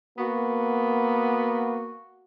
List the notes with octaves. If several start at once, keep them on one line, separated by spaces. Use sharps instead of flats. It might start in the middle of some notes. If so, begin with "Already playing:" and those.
A#3 B3 F#4